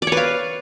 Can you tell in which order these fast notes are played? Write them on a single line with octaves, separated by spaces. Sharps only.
D5 C#5 B4 F5